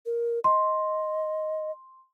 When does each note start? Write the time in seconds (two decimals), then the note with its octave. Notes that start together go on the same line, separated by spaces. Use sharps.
0.06 A#4
0.44 D#5 C6